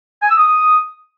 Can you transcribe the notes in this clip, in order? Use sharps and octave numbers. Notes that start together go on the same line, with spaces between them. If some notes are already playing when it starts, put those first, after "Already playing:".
G#5
E6
D#6